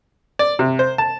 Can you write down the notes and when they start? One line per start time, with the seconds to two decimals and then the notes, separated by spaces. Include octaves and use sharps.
0.39 D5
0.59 C3
0.79 C5
0.98 A5